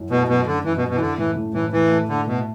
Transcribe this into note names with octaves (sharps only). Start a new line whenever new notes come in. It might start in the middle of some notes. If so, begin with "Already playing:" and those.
Already playing: F#2 F#3 E4
B2 A3
F#2 B2
F#2 D3
F#2 E3
B2
F#2
B2
E3
D3 E4
A2 E3
A2
A2 E3
A2 E3
A3
D3 A3
B2 A3